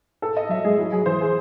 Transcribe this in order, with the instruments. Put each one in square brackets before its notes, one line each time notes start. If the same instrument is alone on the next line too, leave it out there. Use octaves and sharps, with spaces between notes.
[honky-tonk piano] A4
D#5
[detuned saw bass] F#3 [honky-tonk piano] E5
[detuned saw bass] G#3 [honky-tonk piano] G#4
[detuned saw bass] F#3 [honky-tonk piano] E4
[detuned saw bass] F#3 [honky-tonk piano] G#4
[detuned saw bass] E3 [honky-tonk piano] C5
[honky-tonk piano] G#4